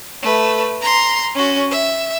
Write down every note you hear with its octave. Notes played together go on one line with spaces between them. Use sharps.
A3 B4
A#5 C6
C#4 F#4
E5